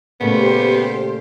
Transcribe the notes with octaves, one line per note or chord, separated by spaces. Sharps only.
A#2 C#3 A3 B3 G4 C5 C6